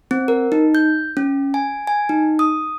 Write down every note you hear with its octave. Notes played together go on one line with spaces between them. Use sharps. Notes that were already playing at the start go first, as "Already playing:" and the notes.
C4
A#4
D#4
G6
C#4
G#5
G#5
D#4
D#6